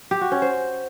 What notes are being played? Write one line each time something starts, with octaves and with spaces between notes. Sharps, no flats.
G4
F#4
C#4
C5